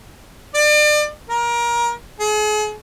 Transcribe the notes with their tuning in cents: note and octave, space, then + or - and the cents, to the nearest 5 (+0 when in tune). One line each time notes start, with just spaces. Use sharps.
D5 +35
A#4 +25
G#4 +40